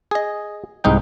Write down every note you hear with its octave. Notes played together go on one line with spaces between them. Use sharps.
G#4 D#5
C2 G#2 D#4 G5